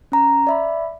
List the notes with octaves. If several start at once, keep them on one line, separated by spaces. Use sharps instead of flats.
C#4 A#5
D5 E5 B5